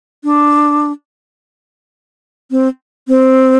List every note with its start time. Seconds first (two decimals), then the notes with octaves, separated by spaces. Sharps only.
0.24 D4
2.51 C4
3.08 C4